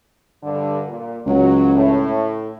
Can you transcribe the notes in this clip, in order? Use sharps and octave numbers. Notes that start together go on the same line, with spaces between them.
G2 D3
A#2
C#2 F#3
A2